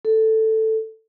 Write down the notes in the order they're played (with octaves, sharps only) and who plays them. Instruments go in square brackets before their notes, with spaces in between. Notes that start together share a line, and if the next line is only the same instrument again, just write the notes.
[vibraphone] A4